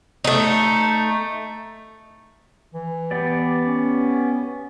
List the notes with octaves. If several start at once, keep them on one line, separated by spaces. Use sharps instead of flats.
A3 D#4
E3
B3 G4 D5
C#4